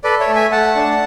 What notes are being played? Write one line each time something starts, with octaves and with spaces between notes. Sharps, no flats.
A4 B4 D5
C#5 E5
A3
E5 G#5
A3 F#5 A5
D4